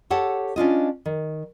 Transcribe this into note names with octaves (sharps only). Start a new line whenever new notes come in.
G4 A4 C#5 F#5 A5
C#4 D4 F4 D#5
D#3